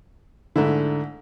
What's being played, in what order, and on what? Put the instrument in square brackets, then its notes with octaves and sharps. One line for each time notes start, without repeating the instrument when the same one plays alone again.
[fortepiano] G#2 A3 E4 [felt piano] D3